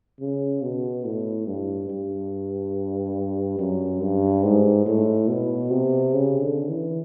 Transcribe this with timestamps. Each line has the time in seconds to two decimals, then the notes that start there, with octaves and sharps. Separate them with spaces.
0.20 C#3
0.62 B2
1.05 A2
1.47 G2
1.89 G2
3.59 F#2
4.01 G2
4.43 G#2
4.86 A2
5.28 B2
5.71 C3
6.14 C#3
6.41 D3
6.69 E3